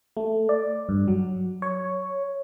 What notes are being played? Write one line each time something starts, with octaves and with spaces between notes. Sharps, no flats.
A3
D5
G2
F#3
C#5